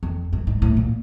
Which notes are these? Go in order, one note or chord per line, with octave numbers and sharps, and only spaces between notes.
F2
G2
G#2
A2
A#2